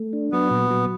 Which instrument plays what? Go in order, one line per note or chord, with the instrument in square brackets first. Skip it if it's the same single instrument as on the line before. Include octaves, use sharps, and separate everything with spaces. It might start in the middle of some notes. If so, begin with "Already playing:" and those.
Already playing: [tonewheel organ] A3
D4
[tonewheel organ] F#3 [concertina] B3
[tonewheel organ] A#2
F#3